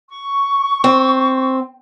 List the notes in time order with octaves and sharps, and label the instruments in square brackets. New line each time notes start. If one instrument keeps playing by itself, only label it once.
[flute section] C#6
[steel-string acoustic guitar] C4